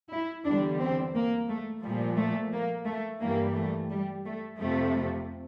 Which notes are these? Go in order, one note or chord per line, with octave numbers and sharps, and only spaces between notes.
E4
E2 D3 G3 D4
C4
A#3
A3
A#2 F3 G3
A3
A#3
A3
G2 E3 G3 A#3
A3
G3
A3
F2 C3 F3 A3